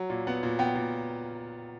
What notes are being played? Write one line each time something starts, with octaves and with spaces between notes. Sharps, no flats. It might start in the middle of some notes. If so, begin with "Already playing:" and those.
Already playing: F#3
A#2
B3 F#5
A#2
B3 G5
A#2